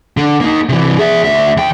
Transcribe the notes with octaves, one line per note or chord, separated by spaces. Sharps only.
D3
A#3 D#4
C3 E3
G#4 E5
D2 E5
D#2 G5